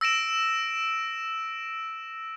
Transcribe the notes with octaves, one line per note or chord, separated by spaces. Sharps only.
E6 A#6 D7 E7